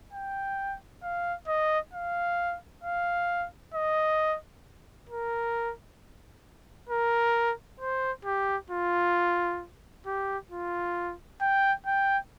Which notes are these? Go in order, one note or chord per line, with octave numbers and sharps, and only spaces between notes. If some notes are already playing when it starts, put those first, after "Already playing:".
G5
F5
D#5
F5
F5
D#5
A#4
A#4
C5
G4
F4
G4
F4
G5
G5